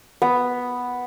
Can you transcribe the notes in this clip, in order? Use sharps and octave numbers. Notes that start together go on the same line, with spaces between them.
B3